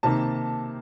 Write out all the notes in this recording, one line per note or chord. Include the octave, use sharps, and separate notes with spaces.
C3 D#3 A#3 A5